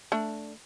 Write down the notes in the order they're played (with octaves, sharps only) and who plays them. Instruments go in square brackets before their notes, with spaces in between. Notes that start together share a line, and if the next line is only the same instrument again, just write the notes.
[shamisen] A3 D4